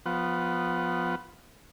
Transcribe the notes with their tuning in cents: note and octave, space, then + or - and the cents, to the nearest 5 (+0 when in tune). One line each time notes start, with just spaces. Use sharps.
F3 +15 B3 +0 F#5 +25